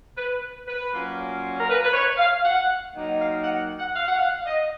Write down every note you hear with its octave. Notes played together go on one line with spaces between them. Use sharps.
B4
B4
A#2 F#3 A#3 C#4 F4
A#4
B4
B4
C#5
F5
F#5
D#3 F#3 A#3 D#4
F5
F#5
F#5
F5
F#5
F5
D#5